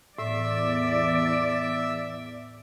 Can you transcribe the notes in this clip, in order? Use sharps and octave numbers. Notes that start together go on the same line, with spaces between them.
E2 A2 D5 E5 E6